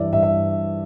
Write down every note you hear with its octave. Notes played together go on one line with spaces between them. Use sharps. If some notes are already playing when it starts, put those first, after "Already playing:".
Already playing: G2 E3 D5 E5
G2 E5
E5